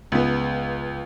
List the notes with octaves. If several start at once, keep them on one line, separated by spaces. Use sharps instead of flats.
C#2 B3